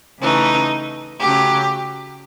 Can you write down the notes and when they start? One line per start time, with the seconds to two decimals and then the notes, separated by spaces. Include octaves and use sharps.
0.20 C#3 E3 A3 D#4
1.20 C#3 F#3 A3 G4